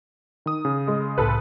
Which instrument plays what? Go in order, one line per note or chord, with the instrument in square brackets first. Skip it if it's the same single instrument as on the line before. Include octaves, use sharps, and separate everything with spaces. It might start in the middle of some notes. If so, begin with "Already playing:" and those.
[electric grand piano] D#3 D#6
C#3
[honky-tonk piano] G#3
[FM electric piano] C2 A2 [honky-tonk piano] A4 B4